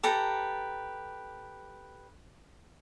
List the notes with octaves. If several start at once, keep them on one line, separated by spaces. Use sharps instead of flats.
G4 A4 B4 A#5